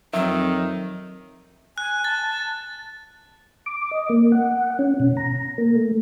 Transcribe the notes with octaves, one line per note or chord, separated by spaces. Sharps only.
F2 D#3 F#3 E5
G#5 F#6
A5 A6
D6
D#5
A#3
F#5
C#4
B2
A#5
A#3
A3